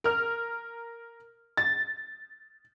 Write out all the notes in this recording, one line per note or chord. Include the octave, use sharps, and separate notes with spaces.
A#4 F6
A6